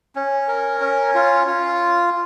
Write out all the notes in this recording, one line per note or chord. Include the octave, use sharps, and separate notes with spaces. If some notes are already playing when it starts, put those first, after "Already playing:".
C#4
A#4
C#4
F4
F4